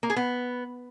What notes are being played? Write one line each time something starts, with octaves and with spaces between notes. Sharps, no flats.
A#3
G#4
B3